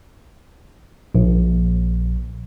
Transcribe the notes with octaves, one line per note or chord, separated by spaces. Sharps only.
A#1